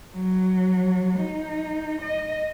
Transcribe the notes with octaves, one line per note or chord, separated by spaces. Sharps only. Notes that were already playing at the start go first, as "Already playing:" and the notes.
F#3
D#4
D#5